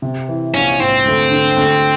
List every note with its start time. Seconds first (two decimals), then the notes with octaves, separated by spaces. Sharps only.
0.02 C3
0.28 E3
0.54 A#1 C#4
0.79 G#2 C4
1.05 D2
1.31 D3
1.57 D2